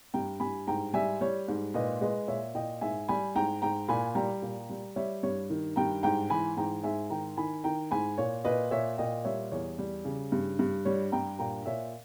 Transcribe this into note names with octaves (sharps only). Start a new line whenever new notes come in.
G2 G5 A#5
G2 G#5 B5
G#2 G5 A#5
G3 E5 G#5
G3 C#5
G#2
A#2 B4 D#5
G#3 B4 D#5
A#2 C#5 E5
A#2 D#5 G5
G#2 E5 G#5
G3 G#5 B5
G#2 G5 A#5
G#2 G5 A#5
A#2 G#5 B5
G3 G5 A#5
A#2
G3
G3 C#5 E5
G2 C#5
D#3
G2 G5 A#5
G#2 G5 A#5
E3 G#5 B5
G#2 G5 A#5
G#2 E5 G#5
D#3 G5 A#5
D#3 G#5 B5
D#3 G5 A#5
G#2 G#5 B5
A#2 C#5
A#2 B4 D#5
A#2 C#5 E5
A#2 D#5 G5
G3 C#5 E5
E2 C#5
G3
C#3
G2
G2
G3 C#5
G2 G5 A#5
A#2 G5 A#5
A#2 C#5 E5